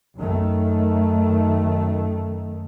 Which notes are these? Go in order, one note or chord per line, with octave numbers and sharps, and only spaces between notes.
F#2 D#3 A3